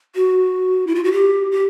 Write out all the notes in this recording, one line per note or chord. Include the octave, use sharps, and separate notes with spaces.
F#4
E4
F4
F#4
G4
G4